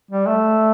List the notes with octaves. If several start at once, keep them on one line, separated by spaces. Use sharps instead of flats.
G3
A3